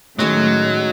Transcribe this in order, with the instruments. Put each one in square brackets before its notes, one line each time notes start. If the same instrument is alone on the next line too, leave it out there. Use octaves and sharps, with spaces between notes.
[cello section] A2 [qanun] D#3 G#3 C#4 [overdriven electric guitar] F#3